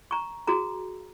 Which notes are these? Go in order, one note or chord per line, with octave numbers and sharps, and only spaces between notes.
A#5 C#6
F#4 G#4 A#5